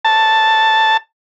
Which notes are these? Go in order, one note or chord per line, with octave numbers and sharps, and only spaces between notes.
A5